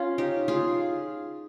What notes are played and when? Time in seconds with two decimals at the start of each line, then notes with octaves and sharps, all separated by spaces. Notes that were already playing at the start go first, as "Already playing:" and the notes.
Already playing: C#4 F4
0.18 D#4 G4
0.48 F4 G#4